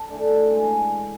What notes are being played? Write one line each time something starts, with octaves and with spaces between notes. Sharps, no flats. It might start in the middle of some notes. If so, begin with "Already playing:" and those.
Already playing: A5
E3 A3 D4
B2
G#3 C#4